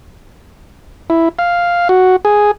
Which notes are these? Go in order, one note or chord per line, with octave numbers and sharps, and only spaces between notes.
E4
F5
F#4
G#4